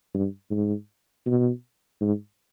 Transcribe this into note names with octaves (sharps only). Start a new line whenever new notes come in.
G2
G#2
B2
G#2